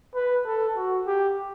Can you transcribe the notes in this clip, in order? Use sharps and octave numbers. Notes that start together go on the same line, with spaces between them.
B4
A4
F#4
G4